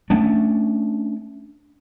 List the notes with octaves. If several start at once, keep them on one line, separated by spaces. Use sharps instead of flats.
A3 C#4 D4